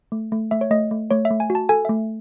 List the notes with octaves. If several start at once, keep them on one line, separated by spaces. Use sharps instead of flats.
A3
A3
A3 E5
C#5
A3 D#5
A3
A3 C#5
E5
A3
G#5
F#4
A5
A4 G#5
A3 E5